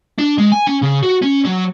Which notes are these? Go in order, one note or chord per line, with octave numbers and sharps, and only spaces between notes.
D4
G#3
G#5
C#4
C#3
F#4
C#4
F#3